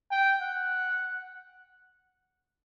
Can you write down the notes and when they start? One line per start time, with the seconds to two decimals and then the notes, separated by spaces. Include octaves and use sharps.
0.11 G5
0.41 F#5